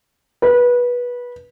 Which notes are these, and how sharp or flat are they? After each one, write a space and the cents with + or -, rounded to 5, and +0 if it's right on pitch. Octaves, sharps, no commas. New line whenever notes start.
B4 -20